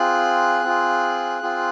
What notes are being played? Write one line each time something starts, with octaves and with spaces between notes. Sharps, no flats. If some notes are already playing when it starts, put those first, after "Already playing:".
Already playing: C4 F4 G#4 F#6
C4 F4 G#4
C4 F4 G#4